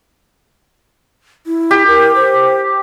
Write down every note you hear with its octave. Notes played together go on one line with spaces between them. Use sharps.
E4
G4
A#4
C5